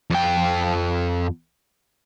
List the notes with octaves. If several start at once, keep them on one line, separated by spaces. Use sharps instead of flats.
F2 G5